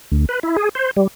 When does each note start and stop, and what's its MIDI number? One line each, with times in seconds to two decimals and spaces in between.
0.12 0.25 38
0.29 0.39 71
0.43 0.56 64
0.57 0.69 68
0.75 0.91 72
0.97 1.07 55